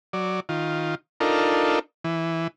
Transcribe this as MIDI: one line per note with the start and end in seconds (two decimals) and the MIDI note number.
0.13 0.40 54
0.13 0.40 74
0.49 0.95 51
0.49 0.95 65
1.20 1.79 62
1.20 1.79 63
1.20 1.79 65
1.20 1.79 69
1.20 1.79 70
2.04 2.47 52